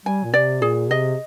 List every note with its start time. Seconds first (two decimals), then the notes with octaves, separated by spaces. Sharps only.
0.06 G3 G#5
0.24 A#2
0.34 C3 D5
0.62 A#2 G#4
0.90 C3 D#5